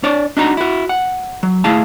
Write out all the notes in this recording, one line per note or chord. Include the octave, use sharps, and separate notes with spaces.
D4 C#5 D5
D4 D#4 F#4 A#5
E4 F#4
F#5
F#3
A2 A3 E4 G#4 F5 A5